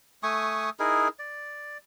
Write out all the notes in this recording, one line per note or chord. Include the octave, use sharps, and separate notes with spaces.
A3 G#5 C#6 D#6
D#4 E4 G#4 A#4
D5